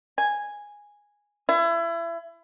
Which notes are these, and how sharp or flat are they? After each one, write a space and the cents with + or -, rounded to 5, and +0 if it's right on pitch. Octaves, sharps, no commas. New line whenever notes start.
G#5 -5
E4 +30